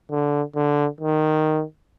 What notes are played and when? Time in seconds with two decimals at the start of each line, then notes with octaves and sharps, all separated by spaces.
0.11 D3
0.56 D3
1.01 D#3